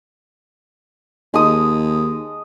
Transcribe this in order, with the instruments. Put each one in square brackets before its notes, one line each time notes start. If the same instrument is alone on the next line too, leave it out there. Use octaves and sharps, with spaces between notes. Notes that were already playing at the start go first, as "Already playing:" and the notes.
[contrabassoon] D#2 [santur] G#3 A5 D#6